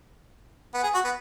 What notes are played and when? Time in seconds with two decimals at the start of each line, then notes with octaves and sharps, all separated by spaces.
0.74 B3
0.83 G#4
0.94 F#4
1.04 B3